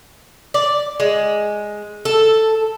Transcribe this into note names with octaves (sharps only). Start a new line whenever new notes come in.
D5
G#3
A4